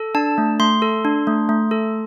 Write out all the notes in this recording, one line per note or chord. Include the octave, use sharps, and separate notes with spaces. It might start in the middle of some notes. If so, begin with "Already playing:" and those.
Already playing: A4
D4 A5
A3
A3 C6
A4
D4
A3
A3
A4